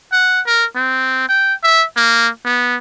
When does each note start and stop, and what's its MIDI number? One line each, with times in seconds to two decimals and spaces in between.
0.12 0.41 78
0.46 0.65 70
0.76 1.24 60
1.29 1.54 79
1.63 1.84 76
1.96 2.29 58
2.45 2.76 59